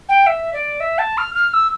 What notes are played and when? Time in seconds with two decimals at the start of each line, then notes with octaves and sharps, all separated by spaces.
0.09 G5
0.26 E5
0.53 D5
0.80 E5
0.98 A5
1.18 F6
1.35 F6
1.53 E6